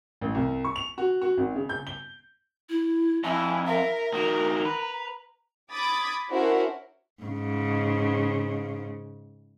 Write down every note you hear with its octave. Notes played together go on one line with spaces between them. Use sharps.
A1
C2
C#6
F7
F#4
F#4
G#1
C#3
G6
G7
E4
F2 E4 G#5
A#4 E5
D#3 F#4 A#5
B4
B5 D6 D#6 G#6 A6
C#4 D4 E4 F#4 A#4 C5
G#2 C#3